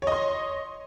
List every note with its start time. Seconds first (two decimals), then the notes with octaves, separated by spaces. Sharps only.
0.02 C#5
0.07 D#5
0.12 C6